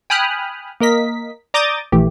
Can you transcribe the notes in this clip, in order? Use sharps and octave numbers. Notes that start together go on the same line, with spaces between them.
G5 G#5 B5 D#6 F6 F#6
A#3 A#4 D#5 B6
D5 A#5 D6 D#6 G6 A6
A#1 E3 A3 G4